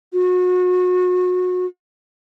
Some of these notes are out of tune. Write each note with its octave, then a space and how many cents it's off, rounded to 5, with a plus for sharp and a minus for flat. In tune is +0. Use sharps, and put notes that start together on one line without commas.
F#4 -30